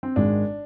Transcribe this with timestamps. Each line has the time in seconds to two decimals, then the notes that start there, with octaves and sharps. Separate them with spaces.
0.03 C4
0.16 G#1 G#2 D#3 G#3 D4